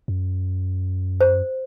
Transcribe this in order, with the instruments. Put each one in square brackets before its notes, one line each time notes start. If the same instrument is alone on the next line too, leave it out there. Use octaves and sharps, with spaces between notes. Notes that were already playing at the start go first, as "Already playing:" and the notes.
[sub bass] F#2
[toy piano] C5